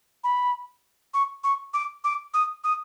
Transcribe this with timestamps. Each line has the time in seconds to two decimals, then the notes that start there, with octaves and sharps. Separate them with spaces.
0.24 B5
1.14 C#6
1.44 C#6
1.74 D6
2.04 D6
2.34 D#6
2.64 D#6